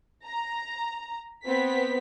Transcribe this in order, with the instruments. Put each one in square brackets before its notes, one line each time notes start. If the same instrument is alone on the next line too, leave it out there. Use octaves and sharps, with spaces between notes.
[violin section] A#5
B3 C4 B6